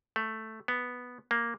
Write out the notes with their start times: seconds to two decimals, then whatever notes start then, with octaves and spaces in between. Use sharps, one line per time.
0.16 A3
0.68 B3
1.31 A#3